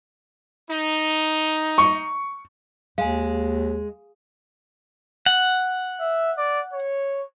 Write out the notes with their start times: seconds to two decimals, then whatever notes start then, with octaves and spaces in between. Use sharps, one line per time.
0.71 D#4
1.78 C#6
2.98 D#2 G#3 F5 G#5
5.26 F#5
6.01 E5
6.38 D5
6.73 C#5